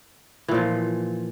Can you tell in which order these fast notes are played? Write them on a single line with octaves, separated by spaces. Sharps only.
E3 A#2 F3